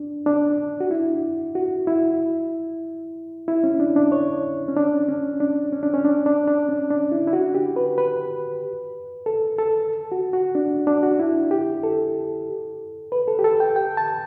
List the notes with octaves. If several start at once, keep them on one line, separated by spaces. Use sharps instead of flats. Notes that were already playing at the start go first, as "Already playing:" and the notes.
Already playing: D4
D4
F#4
E4
F#4
E4
E4
C#4
D4
D4
C#5
C#4
D4
C#4
D4
C#4
D4
C#4
D4
D4
D4
C#4
D4
E4
E4
F#4
G4
B4
B4
A4
A4
F#4
F#4
D4
D4
F#4
E4
G4
A4
B4
A4
G4
A4
G5
G5
A5